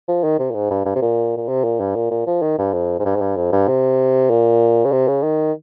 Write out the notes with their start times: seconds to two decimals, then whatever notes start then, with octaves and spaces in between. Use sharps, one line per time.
0.08 F3
0.24 D#3
0.39 C3
0.51 A#2
0.55 G#2
0.71 G2
0.86 G2
0.96 C3
1.02 A#2
1.37 A#2
1.48 C3
1.64 A#2
1.80 G2
1.96 A#2
2.11 A#2
2.27 F3
2.42 D#3
2.58 G2
2.73 F2
2.99 G#2
3.05 G2
3.16 G#2
3.21 G2
3.36 F2
3.52 G2
3.68 C3
4.30 A#2
4.85 C#3
4.92 C3
5.08 C#3
5.23 D#3